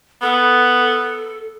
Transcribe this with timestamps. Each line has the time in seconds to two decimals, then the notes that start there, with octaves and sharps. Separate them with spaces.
0.22 B3 A4